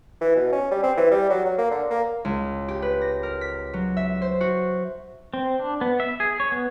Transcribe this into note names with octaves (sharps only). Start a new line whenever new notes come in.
E3
B2
C#4
G3
C4
E3
G3
F#3
F#3
A#3
D3
A#3
C#2
G4
B4
A#6
A#4
B6
F#3
E5
C5
F#4
C4
D4
B3
E5
G#4
C#5
B3